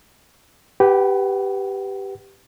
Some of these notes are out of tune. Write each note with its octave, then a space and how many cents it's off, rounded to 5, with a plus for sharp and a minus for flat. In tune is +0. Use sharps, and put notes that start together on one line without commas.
G4 +0 B4 +0 F#5 +35